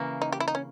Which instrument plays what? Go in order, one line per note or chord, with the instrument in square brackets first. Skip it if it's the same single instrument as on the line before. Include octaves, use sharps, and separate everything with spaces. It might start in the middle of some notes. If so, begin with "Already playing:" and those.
Already playing: [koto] C#3 E3 A#3
[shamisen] D#4
G4
E4
D#4
C#4